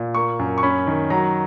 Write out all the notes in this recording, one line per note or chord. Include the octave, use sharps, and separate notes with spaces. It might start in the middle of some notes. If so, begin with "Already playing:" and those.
Already playing: A#2
A#3 C#6
F#2
C#6
C#4 B5
D#3
F#3 A#5